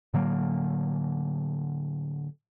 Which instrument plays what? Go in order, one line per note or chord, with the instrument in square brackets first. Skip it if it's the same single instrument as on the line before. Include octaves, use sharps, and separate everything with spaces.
[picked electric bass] A2 D3 F#3 A#3